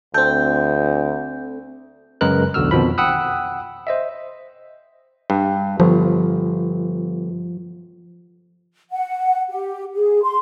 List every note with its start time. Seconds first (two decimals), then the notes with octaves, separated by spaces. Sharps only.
0.14 D2 C4 A4 G6
2.21 F#2 C#3 G#3 A#4 B4 F#6
2.54 B1 E2 D3 F#4 E6 F6
2.71 F2 B2 D#3 F3 B5
2.98 F#5 G5 B5 D#6 E6 F#6
3.87 C5 D#5 E5
5.30 G2
5.80 G1 F3
8.91 F#5
9.50 G4
9.94 G#4
10.23 C6